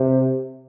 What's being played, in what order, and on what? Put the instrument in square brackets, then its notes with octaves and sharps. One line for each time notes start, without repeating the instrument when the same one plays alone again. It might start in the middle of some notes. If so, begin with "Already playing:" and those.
Already playing: [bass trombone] C3